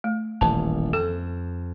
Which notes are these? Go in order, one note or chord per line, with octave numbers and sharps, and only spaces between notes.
A3
D#1 A1 A5
F2 A4